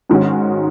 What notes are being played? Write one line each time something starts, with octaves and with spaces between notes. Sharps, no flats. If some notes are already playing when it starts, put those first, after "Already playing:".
G#2 D#3 G#3 C#4 F#4